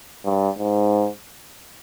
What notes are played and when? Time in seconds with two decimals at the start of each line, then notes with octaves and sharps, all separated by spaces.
0.25 G2
0.59 G#2